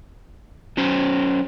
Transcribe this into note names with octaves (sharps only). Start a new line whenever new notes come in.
F#3 C#4 C5